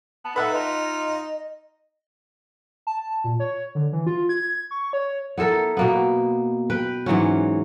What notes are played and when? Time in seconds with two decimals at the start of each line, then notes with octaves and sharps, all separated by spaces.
0.24 B3 A5
0.36 D#4 A4 B4 E5 F#5 B5
0.54 F4 D#5
2.87 A5
3.24 A#2
3.40 C#5
3.75 D3
3.93 E3
4.07 F4
4.29 G#6
4.71 C#6
4.93 C#5
5.37 B3 E4 A4 A#4
5.77 B2 A#3 B3
6.70 B4 G5
7.06 G#2 E3 F#3 C#4